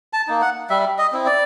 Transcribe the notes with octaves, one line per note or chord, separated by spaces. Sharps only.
A5
A#3 D#4
F#5
G3 E5
D#5
C4 E4
D5